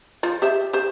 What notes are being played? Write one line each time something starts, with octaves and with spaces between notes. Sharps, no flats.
F3 F4
G4 C5 E5
G4 C5